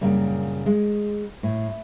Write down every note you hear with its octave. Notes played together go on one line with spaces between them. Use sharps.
F#2 A#2 C#3 G3
G#3
A2